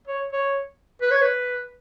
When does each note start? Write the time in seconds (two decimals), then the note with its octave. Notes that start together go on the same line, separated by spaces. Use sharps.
0.08 C#5
0.33 C#5
1.01 B4
1.11 C#5
1.21 B4